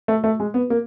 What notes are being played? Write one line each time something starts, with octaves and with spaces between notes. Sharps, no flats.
A3
A3
G#3
B3
A#3